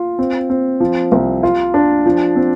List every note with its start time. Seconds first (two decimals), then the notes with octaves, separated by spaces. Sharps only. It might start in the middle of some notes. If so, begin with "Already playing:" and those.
Already playing: F4
0.19 C4
0.50 C4
0.80 F3
1.12 C2
1.43 F4
1.74 D4
2.06 F3
2.36 C4